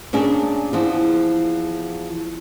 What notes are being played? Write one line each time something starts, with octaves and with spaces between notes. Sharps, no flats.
A#2 C#4 D4 G#4
E2 F3